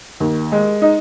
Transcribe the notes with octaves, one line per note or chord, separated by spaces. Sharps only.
D#2
G#3
D#4